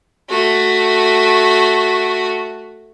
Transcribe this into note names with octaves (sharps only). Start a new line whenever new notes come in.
A3 F#4